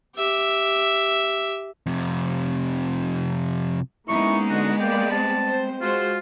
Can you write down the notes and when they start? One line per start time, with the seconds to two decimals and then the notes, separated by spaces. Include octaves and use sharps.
0.16 G4 E5
1.86 F2 C3
4.09 G#3 A#3 B3 C#4 D#4 E4 C#6
4.50 D3 F#4
4.81 A#3 D5 G5
5.12 C4 A5
5.47 C5
5.81 G#3 F4 F#4 C5